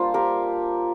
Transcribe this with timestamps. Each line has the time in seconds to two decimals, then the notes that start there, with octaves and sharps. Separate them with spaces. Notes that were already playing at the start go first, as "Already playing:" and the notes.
Already playing: G3 A#3 D4 F4 C5
0.14 G4 A#4